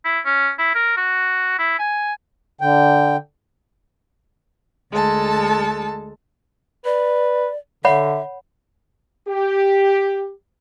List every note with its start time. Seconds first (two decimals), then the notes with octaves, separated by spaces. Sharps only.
0.05 E4
0.25 C#4
0.59 E4
0.75 A#4
0.97 F#4
1.59 E4
1.79 G#5
2.61 D3 G5
4.91 D2 G#3 A4 A5
6.85 B4 D5
7.85 D3 C#5 E5 F#5 B5
9.28 G4